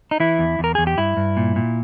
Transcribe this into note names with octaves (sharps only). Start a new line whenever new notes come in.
D#4
E3 E4
E2
E2 A#4
E2 G#4
G4
G2 E4
G2
A#2
A#2